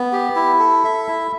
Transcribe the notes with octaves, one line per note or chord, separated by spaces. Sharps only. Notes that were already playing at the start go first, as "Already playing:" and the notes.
Already playing: B3
G4
E4
A4
E5
E4